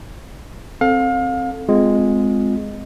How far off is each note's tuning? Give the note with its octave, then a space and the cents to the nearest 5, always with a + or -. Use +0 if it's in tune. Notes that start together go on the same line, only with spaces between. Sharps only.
C4 +10 A4 +0 F5 +30
G#3 +0 C4 -25 F4 +10